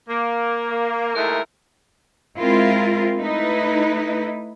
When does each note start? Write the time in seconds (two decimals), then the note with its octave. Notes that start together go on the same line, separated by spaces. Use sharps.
0.09 A#3
1.16 D#2 G#3 A3 E4 A#4
2.37 G#3 C4 E4 F4 A#4
3.18 A3 D#4 E4 B4